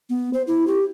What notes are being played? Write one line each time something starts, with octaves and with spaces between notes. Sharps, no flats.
B3
C5
E4
G4